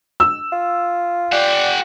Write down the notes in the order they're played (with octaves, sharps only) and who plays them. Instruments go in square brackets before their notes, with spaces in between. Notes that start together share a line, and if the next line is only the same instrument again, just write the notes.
[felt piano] E6
[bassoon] F4
[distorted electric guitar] G4 F#5 [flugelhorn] D5